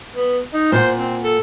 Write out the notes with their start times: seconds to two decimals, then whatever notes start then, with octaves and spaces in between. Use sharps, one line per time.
0.14 B3
0.53 D#4
0.72 A#2 C5 F#5
0.98 C4
1.23 A4